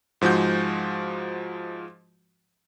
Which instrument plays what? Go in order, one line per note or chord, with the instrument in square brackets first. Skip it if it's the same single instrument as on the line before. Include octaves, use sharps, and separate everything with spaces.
[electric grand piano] G#2 F3 G#3 F#4 G6